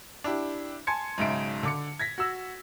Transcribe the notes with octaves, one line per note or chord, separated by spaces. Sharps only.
D4 E4 G4
G#5 A5 C6 G#6 C#7
B1 G#2 C#3 E5 D7
D3 D6 C#7
G#6 A#6 B6
F#4 E6